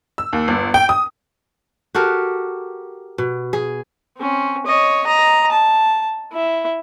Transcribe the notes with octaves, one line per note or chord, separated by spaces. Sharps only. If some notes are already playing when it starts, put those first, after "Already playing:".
E6
D#2
G1
G5
D#6
F#4 G4 A4 A#4
B2
G#4
C4 C#4
C#5 D#5
D#5 A#5
A5
E4 E5